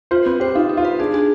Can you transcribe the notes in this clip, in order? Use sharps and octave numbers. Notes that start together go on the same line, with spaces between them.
F4 C5
C4 B4
G4 C5
D#4 F4
D#4
F4
B4
D4 G#4
G#4